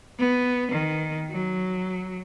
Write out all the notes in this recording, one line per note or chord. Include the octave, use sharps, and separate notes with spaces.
B3
D#3
F#3